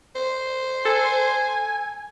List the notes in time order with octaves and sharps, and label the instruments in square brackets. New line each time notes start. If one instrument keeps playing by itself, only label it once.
[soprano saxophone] C5
[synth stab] A4 [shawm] G#5